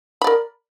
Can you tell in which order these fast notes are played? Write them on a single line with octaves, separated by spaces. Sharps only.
B5 D5 A#4